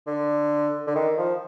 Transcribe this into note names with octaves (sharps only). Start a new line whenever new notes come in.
D3
D3
D#3
F3